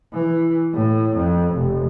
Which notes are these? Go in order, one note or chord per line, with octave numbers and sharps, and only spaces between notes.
E3
A2
F2
F1